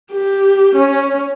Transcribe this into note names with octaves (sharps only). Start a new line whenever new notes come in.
G4
C#4